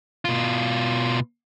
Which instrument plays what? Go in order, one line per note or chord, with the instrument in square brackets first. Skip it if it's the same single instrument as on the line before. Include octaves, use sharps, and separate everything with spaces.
[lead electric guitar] B2 F4